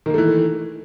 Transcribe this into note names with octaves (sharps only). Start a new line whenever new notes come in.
D#3 E3 A3 A#3